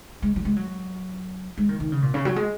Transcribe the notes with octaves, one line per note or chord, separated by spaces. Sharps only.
G#3
F#3
G#3
F#3
G#3
D#3
D#3
C#3
A#2
C#3
F#3
G#3